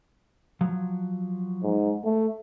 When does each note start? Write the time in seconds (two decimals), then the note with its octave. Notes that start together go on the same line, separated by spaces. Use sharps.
0.61 F3 F#3
1.63 G#2
2.04 A3